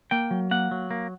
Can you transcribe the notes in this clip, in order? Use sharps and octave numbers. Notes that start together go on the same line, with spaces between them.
A#3 G5
F#3
A#3 F#5
F#3
A#3